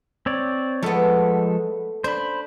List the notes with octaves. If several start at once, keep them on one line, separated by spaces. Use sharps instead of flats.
C4 C#5 D5
F3 G#3 A3 B3 A4
D4 C5 B5